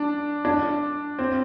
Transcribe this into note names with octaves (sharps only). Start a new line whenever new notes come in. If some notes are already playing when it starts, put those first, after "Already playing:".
Already playing: D4
D4
C4